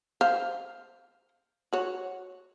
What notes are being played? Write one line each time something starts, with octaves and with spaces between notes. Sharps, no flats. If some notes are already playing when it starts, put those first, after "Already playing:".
C5 F5
F#4 C#5